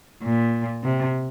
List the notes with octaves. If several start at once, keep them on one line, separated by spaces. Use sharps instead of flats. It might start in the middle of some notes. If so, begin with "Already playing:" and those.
A#2
C3